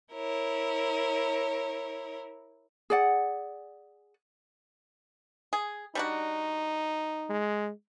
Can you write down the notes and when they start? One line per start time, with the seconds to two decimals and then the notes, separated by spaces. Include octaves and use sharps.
0.12 E4 A#4 C#5
2.90 G#4 D5 F#5
5.53 G#4
5.95 G3 D4 D#4 F#4
7.29 G#3